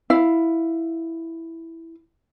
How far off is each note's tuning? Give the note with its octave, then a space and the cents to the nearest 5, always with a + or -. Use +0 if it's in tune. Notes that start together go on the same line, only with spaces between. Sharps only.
E4 +0 F5 +0